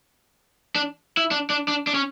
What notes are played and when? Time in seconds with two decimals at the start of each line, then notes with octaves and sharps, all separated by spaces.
0.76 D4
1.17 E4
1.31 D4
1.50 D4
1.68 D4
1.87 D4
1.95 C#4